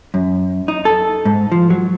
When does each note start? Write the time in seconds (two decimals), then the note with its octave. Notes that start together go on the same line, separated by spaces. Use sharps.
0.14 F#2
0.68 D#4
0.85 A4
1.25 G#2
1.52 F3
1.70 F#3